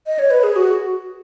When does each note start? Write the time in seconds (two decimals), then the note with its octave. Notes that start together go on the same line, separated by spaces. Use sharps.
0.06 D#5
0.19 C#5
0.31 B4
0.43 G#4
0.56 F#4